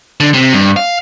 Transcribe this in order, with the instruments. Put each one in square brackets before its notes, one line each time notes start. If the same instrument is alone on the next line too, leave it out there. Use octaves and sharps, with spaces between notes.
[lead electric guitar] D3
C3
G2
F5